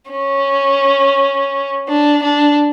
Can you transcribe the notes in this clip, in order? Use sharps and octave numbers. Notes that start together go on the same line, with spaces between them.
C#4
D4
D4